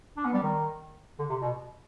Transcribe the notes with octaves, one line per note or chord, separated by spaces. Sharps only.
D4
B3
G3
D#3
D3
C3
B2